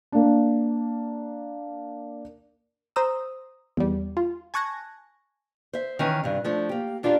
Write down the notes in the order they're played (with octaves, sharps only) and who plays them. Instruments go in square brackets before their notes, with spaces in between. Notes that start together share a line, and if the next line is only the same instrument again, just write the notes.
[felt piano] A#3 D4
[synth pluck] C5 A#5 D#6 E6
E2 G3
F4
G#5 A5 C#6 F#6 G#6 A#6
[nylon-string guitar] C5 E5
D#3 E3 C#4 B4
G2 C3
F3 A3 D4
A#3 G4
E2 D4 F4 G4 A#4 D5